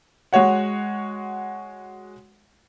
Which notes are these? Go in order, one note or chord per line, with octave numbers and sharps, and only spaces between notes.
G#3 F#4 C#5 F#5